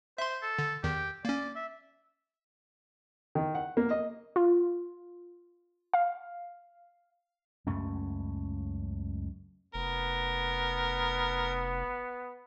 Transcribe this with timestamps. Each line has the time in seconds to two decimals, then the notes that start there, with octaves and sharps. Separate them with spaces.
0.18 C5 E5 C6
0.42 A4
0.59 D3
0.84 E2 D#3 G4
1.25 A#3 C#4 D5
1.55 E5
3.35 D#3
3.55 F#5
3.77 A#3
3.91 D#5
4.36 F4
5.94 F5
7.67 C#2 F#2 A3 C#4
9.74 F1 B3 A#4